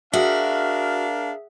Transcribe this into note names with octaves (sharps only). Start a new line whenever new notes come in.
D4 F#4 G#4 A#4 E5 F5